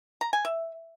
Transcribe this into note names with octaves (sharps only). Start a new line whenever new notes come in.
A#5
G#5
E5